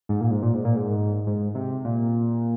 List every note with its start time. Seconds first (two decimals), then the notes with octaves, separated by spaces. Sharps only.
0.09 G#2
0.21 A#2
0.31 G#2
0.43 A#2
0.54 G#2
0.65 A#2
0.76 G#2
1.27 G#2
1.55 C3
1.85 A#2